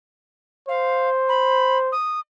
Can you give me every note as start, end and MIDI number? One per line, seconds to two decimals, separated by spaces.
0.68 1.92 72
0.68 1.09 77
1.29 1.78 83
1.92 2.20 87